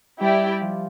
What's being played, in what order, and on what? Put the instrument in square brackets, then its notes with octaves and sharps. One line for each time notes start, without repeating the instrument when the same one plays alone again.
[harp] G3 [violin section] E4 G4 D5 G5
[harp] F3